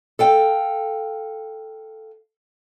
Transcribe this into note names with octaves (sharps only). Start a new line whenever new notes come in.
A4 F5 G5